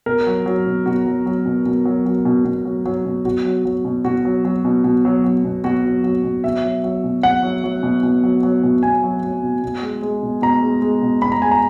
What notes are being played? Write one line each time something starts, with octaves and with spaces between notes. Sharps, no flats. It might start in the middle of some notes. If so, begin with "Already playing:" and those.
B2 A#4
F#3
F#3
B2
B2 F#4
F#3
F#3
B2
B2
F#3
F#3
B2
B2
F#3
F#3
B2
B2 F#4
F#3
F#3
B2
B2 F#4
F#3
F#3
B2
B2
F#3
F#3
B2
B2 F#4
F#3
F#3
B2
B2 E5
F#3
F#3
B2
B2 F#5
F#3
F#3
B2
B2
F#3
F#3
B2
B2 G#5
F#3
F#3
B2
B2
G#3
G#3
B2
B2 A#5
G#3
G#3
B2
B2 B5
A#5
G#3 G#5
A#5